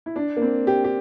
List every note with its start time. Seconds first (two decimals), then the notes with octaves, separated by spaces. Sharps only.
0.06 E4
0.16 D4
0.36 A#3
0.42 C4
0.67 G4
0.84 G4